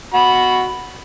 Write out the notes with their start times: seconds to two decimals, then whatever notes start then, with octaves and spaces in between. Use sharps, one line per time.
0.14 F#4 B5